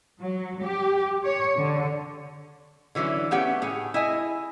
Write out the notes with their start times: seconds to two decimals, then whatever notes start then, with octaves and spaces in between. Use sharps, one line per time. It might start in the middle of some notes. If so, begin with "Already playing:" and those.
0.20 F#3
0.64 G4
1.25 C#5
1.57 D3
2.95 D3 E3 F#3 C#4 E4
3.31 A3 B3 C#4 G4 F#5
3.62 A2 G#4
3.94 E4 D#5 G#5